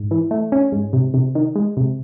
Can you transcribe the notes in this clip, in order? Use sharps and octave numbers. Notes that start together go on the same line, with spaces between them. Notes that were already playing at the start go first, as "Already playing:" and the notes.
Already playing: G#2
E3
A3
C#4
G#2
C3
C3
D#3
G#3
C3